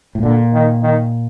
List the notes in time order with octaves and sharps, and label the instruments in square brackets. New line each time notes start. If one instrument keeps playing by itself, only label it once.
[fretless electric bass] A2
[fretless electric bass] A#2 [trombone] D3
[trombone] D#3
D#3